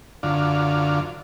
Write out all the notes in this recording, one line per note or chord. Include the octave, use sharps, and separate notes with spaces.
F#2 D3 F4